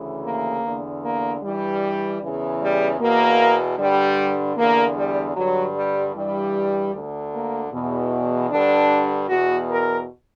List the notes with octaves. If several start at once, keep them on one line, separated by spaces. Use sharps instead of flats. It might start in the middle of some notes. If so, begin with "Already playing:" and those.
Already playing: D2 C#3 E3
A#3
E2 D3
A#3
G2 E3 G3
E2 C#3 E3
G3
E2 B2 A#3
G2 D3 G3
E2 D3 A#3
G3
G2 D3 F#3
G3
G2 E3 G3
D2 D3
A#3
E2 B2
G2 D3 D4
E2 B2 F#4
A#4